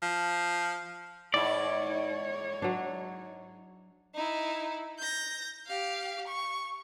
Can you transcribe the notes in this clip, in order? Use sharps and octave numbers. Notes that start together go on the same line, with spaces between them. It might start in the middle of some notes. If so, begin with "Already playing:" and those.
F3
G#2 E4 C#5 D5
F#3 D4
D#4 E4
G6 A#6
G4 F5
C#6